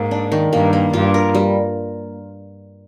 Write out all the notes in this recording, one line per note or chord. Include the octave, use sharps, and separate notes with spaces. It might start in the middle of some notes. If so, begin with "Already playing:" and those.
Already playing: G#2 A#3
D4
D#3
G2 A#3
A#3
G2 F4
A#4
G3